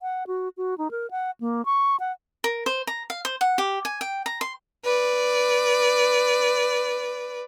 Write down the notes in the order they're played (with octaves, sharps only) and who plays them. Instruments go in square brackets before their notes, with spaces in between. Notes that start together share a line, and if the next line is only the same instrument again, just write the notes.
[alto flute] F#5
F#4
F#4
D#4
A#4
F#5
A#3
C#6
F#5
[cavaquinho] A#4
C5
A#5
F5
C5
F#5
G4
G#5
G5
A#5
C6
[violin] B4 D5